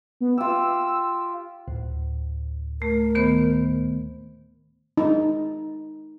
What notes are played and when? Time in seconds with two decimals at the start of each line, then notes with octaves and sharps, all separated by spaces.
0.21 B3
0.38 F4 G4 E6
1.68 D2 A2
2.82 A3 A#4
3.15 D#3 B3 C5
4.97 D#4